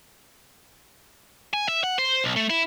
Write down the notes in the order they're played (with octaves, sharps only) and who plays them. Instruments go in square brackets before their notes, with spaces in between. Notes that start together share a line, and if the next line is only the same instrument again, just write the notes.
[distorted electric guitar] G#5
E5
F#5
C5
B1
A3
E4